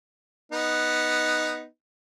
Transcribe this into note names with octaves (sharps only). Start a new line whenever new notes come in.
B3 D#4